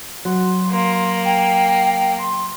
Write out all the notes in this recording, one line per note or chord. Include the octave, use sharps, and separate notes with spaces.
F#3 C6
A#3
G5
C6